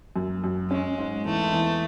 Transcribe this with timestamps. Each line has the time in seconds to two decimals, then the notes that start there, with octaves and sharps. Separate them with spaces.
0.16 F#2
0.44 F#2
0.70 G#3 C#4
0.98 G#2
1.25 E2 A3
1.52 E2